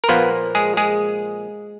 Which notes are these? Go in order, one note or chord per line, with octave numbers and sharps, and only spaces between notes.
A#4
A#2 F3 A#3 B3 B4
G#3 G#4
G#3 G#4